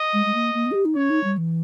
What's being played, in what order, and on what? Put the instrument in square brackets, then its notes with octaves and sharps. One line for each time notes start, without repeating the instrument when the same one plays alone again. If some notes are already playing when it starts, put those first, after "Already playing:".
Already playing: [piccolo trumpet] D#5
[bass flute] G#3
G#3
A#3
A#3
B3
G#4
G4
D#4
[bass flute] C#4 [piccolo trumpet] C#5
[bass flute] D#4
G3
E3